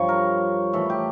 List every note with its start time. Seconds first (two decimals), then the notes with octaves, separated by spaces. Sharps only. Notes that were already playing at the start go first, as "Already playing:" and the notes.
Already playing: G2 F3 C#5
0.09 A#4
0.73 A2 E3 A4
0.90 G4